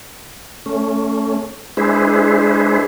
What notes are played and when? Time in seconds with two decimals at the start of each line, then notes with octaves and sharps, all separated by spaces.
0.66 A3 C#4
1.77 G#3 D4 E4 G#4 B4 C5